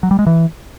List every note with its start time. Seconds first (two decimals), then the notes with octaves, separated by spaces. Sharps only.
0.03 F#3
0.11 G3
0.19 G#3
0.27 E3